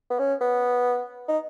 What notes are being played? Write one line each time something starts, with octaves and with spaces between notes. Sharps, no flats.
B3
C#4
B3
D#4